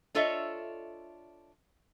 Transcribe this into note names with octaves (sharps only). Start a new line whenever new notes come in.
D4 F4 A4 C#5 D#5 E5